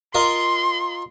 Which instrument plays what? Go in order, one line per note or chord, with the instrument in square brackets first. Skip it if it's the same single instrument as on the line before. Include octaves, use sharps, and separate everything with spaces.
[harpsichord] F4 A#4 D#5 [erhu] C6